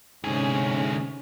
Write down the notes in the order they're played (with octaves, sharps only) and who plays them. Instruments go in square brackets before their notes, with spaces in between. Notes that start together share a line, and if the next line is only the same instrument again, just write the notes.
[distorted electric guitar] D2 G#4 [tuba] G#2 [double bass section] C3 C#4